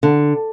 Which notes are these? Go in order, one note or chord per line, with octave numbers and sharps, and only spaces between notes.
D3